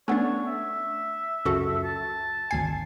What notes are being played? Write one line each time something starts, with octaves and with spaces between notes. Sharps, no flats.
A3 B3 C#4 D4 C#5
E5
C#2 F#2 F#4 A4
A5
G#1 D2 G#5 C7